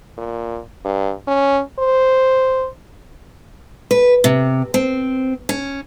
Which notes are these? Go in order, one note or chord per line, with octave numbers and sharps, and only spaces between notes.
A#2
G2
C#4
C5
B4
C3
C4
C#4